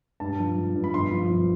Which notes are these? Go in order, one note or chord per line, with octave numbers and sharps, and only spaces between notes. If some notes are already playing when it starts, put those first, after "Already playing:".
G2 A5
F3
F3
G2
B5
G1 C6
F3
F3